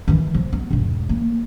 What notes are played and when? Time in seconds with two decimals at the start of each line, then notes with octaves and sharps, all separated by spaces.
0.08 D#3 E3
0.34 A#2 F3
0.53 B3
0.71 E1 G#2
1.09 A#3